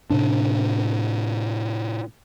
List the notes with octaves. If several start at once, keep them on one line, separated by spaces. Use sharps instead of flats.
A2 C3 D4